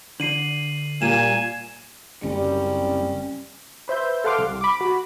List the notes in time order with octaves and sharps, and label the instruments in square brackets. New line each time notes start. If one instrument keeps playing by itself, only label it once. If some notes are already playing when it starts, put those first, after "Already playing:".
[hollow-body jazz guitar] D3 [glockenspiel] C7 D#7 F#7
[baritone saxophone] A#2 [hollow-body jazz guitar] G3 [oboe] G#5 [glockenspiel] D#7 E7
[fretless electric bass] F#1 [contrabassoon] C2 [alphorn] G3 [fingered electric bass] C#4
[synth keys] B4 C5 E5 G6
A4 F5 F#5 C6 D6 F6
C2
B5 D6
F#4 B5